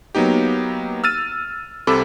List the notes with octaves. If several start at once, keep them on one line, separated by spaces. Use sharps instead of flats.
F#3 A#3 B3 D#4 G4
E6 F6 A6 D#7
C2 C3 A4 B5 D6